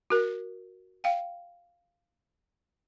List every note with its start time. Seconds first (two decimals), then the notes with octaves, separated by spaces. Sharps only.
0.10 F#4 A#4
1.04 F5 G5